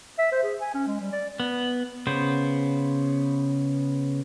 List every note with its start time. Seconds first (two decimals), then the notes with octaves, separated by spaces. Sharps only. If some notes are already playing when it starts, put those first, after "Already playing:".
0.19 E5
0.32 C5
0.43 G#4
0.61 G#5
0.74 C#4
0.87 G#3
1.01 G3
1.12 D5
1.40 B3
2.07 C#3 B3 C5